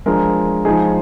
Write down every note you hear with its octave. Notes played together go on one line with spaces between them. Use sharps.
F3 G#3 D4 A#4
F3 G#3 D#4 G#4